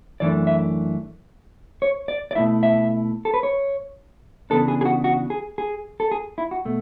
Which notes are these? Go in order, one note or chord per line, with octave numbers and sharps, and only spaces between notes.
F#2 E3 A3 D4 D5
E5
C#5
D5
D5
B2 A3 E4 E5
E5
A4
B4
C#5
C#3 E3 B3 D4 A4
G#4
G#4
F#4
F#4
G#4
G#4
A4
G#4
E4
F#4
B2 A3